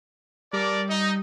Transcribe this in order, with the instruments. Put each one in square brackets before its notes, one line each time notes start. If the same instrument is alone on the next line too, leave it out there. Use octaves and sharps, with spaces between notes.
[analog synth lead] G3 [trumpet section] A4 A#4 D5
[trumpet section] D#4